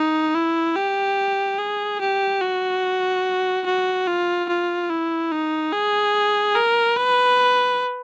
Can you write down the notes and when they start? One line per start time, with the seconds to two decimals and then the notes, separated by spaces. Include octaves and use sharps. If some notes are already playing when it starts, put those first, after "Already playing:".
Already playing: D#4
0.35 E4
0.76 G4
1.59 G#4
2.01 G4
2.42 F#4
3.66 F#4
4.07 F4
4.49 F4
4.89 E4
5.32 D#4
5.73 G#4
6.55 A#4
6.96 B4